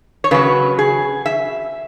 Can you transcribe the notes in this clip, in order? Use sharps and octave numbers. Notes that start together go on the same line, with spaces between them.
C#5
C#3 F#3 B4
G#4
E5